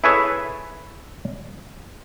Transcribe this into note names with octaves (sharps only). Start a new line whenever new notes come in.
E4 G#4 A4 B4 C#5 E5